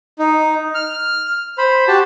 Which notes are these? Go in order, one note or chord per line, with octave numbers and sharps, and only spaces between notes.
D#4
F6
C5 B5
F#4 G4 A5